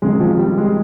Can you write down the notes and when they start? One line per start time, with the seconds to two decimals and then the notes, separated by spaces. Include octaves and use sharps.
0.02 F2 C3 D#3 G#3
0.20 F3
0.38 G3
0.57 G#3